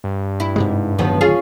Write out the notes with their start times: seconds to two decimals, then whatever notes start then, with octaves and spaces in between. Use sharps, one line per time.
0.04 G2
0.40 E4
0.56 G#2 C3 G#3
0.99 D1 D#3 F3 F#3 B3 C#4
1.21 C#4 F4 G#4